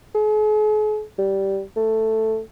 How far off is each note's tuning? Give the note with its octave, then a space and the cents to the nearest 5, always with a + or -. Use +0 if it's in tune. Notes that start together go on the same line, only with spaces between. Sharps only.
G#4 +45
G3 -10
A3 +5